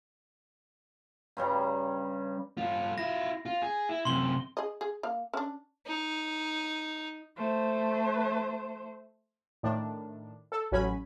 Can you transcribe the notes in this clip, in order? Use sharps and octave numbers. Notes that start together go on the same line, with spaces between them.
G2 C#3 G3 A#5
G2 F4
E4 F4 A#6
F4
G#4
E4
F#2 C3 C6 G7
G#4 D#5
G#4
A#3 F5
C#4 D4
D#4
A3 C5
A2 D#3 D4
A4
A1 F#3 C#4 G#5 B5